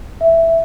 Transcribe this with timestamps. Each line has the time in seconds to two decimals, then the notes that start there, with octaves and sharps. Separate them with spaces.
0.21 E5